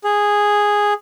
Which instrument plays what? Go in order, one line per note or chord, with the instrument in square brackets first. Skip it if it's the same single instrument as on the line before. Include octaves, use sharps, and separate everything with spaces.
[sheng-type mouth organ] G#4